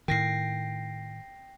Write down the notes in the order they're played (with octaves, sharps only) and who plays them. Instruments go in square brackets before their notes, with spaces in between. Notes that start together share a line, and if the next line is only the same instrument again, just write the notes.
[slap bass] A2 D#3 [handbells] G5 A#6 C7